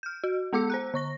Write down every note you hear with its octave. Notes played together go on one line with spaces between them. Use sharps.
F6 G6
F#4
G#3 B3 A4 D6 E6 C#7
C5 A#5 F#6
D3 C#6 A#6